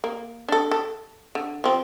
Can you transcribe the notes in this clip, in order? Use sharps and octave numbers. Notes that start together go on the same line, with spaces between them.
A#3
D4 A4
A4
D3
F3 C4